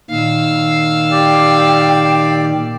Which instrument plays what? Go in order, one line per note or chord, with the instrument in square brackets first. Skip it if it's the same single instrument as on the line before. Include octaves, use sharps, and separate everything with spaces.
[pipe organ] A#2 D#3 [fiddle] F5 E6
[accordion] G4 D5 [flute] G5